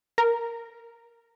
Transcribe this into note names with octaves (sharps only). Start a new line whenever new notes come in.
A#4